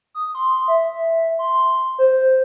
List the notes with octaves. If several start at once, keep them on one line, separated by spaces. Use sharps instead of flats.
D#6
C6
E5
C6
C5